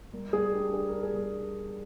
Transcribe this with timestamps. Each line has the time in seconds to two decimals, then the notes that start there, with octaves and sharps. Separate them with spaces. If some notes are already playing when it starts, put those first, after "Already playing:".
0.13 G3 A#4
0.33 G3 G#4
0.54 D4 G4
0.73 D4 G#4
0.89 A#4
0.93 D4
1.03 G#4
1.14 G3